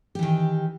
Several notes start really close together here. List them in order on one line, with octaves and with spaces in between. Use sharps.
G4 E3 D#3